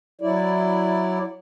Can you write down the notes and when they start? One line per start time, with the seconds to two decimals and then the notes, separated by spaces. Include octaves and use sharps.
0.21 F#3 E4 D5